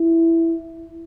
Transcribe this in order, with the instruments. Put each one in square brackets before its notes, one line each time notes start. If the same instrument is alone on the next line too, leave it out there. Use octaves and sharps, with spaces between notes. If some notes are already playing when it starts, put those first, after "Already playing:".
Already playing: [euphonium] E4